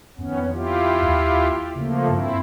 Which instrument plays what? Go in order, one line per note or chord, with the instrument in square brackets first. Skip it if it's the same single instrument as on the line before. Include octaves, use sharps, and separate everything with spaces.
[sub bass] F2 [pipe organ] D#3 B3 C#4
[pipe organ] E4 F4 G4
[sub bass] D#2
[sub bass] C#3 [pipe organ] F3 A3 A#3
[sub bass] G2 [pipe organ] C4 E4